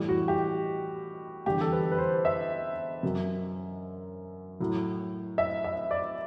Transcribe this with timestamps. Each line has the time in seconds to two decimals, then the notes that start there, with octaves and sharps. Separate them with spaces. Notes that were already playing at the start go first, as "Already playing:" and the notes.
Already playing: A2 E3 G3
0.09 F#4
0.28 G4
1.46 E2 D3 G3 G4
1.61 A4
1.72 B4
1.91 B4
1.98 C5
2.25 E5
3.03 F#2 F#3
4.60 A2 F#3
5.38 E5
5.64 E5
5.91 D5